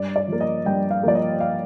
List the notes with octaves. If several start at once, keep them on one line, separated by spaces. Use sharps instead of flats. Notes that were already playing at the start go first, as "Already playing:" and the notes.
Already playing: G2 D5
D5
F3 A#3
D#5
G2 G5
F5
F3 A#3 D5
D#5
F5